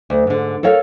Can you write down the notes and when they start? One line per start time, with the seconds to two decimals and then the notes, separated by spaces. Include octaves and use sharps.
0.10 D2
0.27 G#2 D3
0.63 A4 A#4 C#5 F5